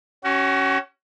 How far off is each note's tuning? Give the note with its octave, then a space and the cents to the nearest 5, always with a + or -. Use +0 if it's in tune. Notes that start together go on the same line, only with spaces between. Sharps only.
C#4 +0 F#4 +35